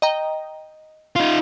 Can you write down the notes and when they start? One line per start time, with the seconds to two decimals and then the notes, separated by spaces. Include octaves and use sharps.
0.02 D#5 G5 A#5
1.16 D#4 F4